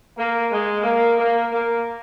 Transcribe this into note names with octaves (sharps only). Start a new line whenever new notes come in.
A#3
G#3
A#3
A#3
A#3